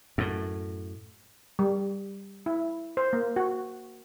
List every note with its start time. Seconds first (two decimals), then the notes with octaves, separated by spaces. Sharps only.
0.18 F#2 A2
1.59 G3
2.46 E4
2.97 C5
3.13 A#3
3.36 F#4